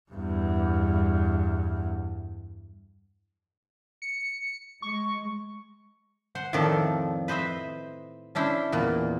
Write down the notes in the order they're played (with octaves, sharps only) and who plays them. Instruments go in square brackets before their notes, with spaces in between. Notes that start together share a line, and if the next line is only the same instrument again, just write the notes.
[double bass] E2 G2
[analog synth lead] C#7
[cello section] G#3 [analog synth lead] C#6
[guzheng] C5 F#5
F2 A2 D#3 F3 A4 D5
B4 C5 D#5 E5
C#4 D4 E4 C5
E2 A#2 D#5